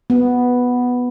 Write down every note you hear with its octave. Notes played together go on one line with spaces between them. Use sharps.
B3